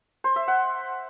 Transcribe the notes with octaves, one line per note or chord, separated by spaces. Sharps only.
C5
E5
F#5